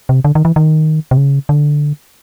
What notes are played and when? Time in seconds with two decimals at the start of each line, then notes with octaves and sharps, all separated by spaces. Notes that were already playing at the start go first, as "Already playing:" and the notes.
0.09 C3
0.25 D3
0.35 D#3
0.45 E3
0.56 D#3
1.11 C3
1.17 C#3
1.49 D3